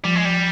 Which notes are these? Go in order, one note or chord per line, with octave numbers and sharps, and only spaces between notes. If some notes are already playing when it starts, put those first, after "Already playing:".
F3 G3
G#3
G3